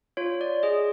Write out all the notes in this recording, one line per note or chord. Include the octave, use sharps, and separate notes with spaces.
F4 C#5
D5
G#4 D#5